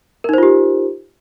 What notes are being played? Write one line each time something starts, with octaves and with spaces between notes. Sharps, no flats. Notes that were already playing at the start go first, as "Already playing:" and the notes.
D#4 F4 G4 A#4 C5